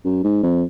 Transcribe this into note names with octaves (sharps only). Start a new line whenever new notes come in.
F#2
G#2
F2